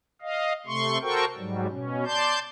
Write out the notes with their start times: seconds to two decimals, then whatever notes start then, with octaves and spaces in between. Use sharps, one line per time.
0.22 D#5 F5
0.66 C3 A3 C6 C#6
1.02 F#4 A4 A#4 C5 G5 C#6
1.37 G#2 F#3 G3
1.70 B2 C#4
2.05 D5 A5 C6 G6